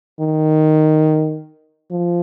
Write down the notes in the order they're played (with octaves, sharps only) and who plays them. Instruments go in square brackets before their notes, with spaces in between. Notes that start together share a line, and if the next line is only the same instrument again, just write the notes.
[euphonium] D#3
F3